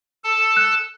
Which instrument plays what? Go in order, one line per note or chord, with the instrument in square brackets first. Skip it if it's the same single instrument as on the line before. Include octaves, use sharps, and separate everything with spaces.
[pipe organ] A4 A5
[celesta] F#6